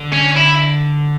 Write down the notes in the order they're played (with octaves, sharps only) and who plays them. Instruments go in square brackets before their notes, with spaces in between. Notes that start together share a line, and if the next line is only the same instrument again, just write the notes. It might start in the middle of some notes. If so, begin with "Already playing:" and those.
Already playing: [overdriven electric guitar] D3
[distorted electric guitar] C#4
E4